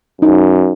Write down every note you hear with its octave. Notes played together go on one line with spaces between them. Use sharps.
F#2 D#4